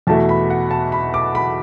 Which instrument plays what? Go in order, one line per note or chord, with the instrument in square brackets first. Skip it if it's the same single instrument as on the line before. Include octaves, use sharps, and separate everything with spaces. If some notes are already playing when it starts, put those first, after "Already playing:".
[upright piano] E2 B2 A3 E4 A5
B5
F#5
A5
B5
D6
B5